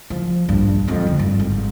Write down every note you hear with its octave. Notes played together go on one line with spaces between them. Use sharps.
F3
A#1 G2
F2 G#3
D2
G2
G#1